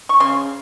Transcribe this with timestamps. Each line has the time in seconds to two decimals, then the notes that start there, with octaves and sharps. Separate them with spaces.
0.09 C#6
0.20 C#3 C6